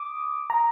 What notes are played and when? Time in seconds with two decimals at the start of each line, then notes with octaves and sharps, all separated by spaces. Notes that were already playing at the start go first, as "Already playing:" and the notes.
Already playing: D6 D#6
0.50 A#5